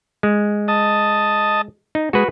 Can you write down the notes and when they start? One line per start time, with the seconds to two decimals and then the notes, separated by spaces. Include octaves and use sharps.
0.23 G#3
0.68 D#5 A5
1.95 D#4
2.13 G#3 F#4 B4